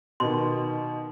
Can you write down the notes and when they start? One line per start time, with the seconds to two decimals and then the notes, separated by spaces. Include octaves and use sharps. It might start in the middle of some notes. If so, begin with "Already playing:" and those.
0.20 B2 D#3 C6